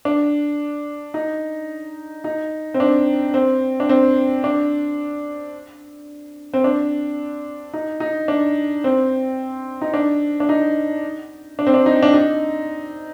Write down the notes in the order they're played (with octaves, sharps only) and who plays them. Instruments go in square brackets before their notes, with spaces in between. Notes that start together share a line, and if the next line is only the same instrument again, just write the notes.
[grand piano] D4
D#4
D#4
C4
D4
C4
D4
C4
D4
C4
D4
D#4
D#4
D4
C4
D#4
D4
D4
D#4
D4
C4
D4
D#4
D4
D#4